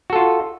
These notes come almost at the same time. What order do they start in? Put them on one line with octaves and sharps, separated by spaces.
F#4 A4 F4